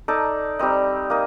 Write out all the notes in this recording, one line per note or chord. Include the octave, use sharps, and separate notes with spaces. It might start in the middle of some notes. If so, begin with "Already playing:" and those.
D#4 A4 D5
G3 C4 D#4
A#3 D#4